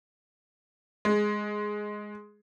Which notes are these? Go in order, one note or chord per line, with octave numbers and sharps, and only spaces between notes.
G#3